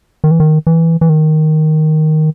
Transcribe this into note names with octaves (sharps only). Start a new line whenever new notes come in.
D#3
E3
D#3
E3
E3
D#3